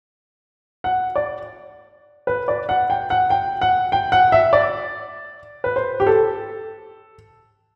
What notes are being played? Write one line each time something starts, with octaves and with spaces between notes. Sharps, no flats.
F#5
D5
B4
D5
F#5
G5
F#5
G5
F#5
G5
F#5
E5
D5
B4
C5
G4
A4